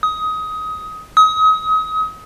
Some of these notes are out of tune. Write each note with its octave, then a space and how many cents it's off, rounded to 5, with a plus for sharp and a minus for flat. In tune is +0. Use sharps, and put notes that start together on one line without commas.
D#6 +20
D#6 +35